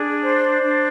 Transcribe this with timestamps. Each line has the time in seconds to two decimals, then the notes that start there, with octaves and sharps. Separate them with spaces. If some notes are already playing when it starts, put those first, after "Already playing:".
Already playing: D4 G#4
0.23 C5
0.63 D4